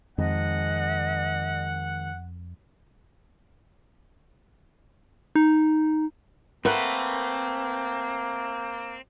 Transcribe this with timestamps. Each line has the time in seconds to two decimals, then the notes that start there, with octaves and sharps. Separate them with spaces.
0.18 F2 D#3 G#3 D#5 F#5
5.35 D#4
6.65 A3 A#3 C4 A#4 B4 F#5